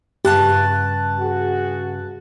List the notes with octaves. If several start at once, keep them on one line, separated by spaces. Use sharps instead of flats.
G2 C#3 G4 A5 F#6 A6
F#4 G#4